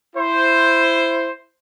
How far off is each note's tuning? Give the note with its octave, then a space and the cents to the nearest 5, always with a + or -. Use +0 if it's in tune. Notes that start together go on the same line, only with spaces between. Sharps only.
E4 +15 C5 +0